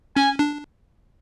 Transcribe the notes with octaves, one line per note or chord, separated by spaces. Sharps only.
C#4 G#5
D4